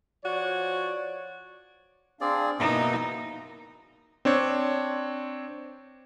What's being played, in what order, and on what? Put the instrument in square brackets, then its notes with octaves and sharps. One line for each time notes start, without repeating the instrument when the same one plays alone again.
[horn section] F3 F#4 C#5 D5
[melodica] C4 G#4 D5 [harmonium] D4 F5
[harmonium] B2 A#3 E5 [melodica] B3 [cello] D#4
[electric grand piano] C4 D4 C#5